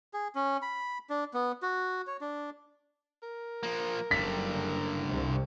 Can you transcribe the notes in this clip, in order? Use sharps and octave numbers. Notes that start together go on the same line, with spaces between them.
G#4
C#4
B5
D4
B3
F#4
C#5
D4
A#4
F3 A#3
F#1 G2 D3 B6
C2 C3